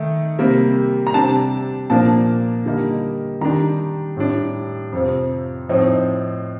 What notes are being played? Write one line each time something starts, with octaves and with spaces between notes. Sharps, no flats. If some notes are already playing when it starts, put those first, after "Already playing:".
Already playing: D#3 A3 D#4
C3 G3 A#3
A#5
C3 G3 D4 A5
A#2 F3 A#3 D4 A5
D3 G3 A#3 D#4
D#3 G3 D4 A#5
A2 G3 D4
F2 C3 F3
A2 F3 C4 D#4